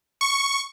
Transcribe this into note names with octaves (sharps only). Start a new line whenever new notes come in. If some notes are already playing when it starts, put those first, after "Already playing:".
C#6